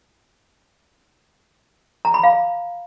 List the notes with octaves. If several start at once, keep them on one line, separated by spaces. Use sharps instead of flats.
A#5
B5
F5